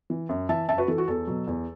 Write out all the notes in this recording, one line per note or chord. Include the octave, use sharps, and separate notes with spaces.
E3
F#2
E3 E5 A5
F#2 E5 A5
F#4 B4
E3 A4
F#4
E2 A4
B2 F#3
E2